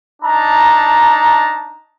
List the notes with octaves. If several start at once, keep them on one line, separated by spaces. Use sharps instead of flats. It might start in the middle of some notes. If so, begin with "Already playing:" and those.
D4 D#4 A5 A#5